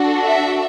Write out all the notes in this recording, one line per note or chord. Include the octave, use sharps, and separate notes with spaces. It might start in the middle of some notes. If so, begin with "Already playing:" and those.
Already playing: D4 F#4 A4
E5